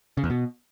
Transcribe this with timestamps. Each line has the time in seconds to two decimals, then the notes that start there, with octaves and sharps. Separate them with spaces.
0.17 C#3
0.24 E2
0.30 B2